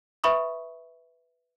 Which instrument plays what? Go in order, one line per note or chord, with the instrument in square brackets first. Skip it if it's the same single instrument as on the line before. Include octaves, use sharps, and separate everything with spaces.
[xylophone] B4 E5 B5 C#6 D#6